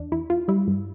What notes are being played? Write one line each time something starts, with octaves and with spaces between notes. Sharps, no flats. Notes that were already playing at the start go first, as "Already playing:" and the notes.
Already playing: E2 D4
E2 E4
E2 F4
G3 E4
G2